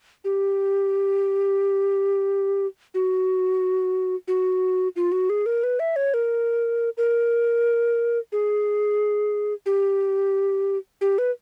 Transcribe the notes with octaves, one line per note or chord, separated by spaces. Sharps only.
G4
F#4
F#4
F4
F#4
G#4
A#4
B4
E5
C#5
A#4
A#4
G#4
G4
G4
B4